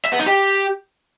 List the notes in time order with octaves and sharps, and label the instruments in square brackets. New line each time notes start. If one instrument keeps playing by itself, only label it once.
[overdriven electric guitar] E5
B3
D#4
G4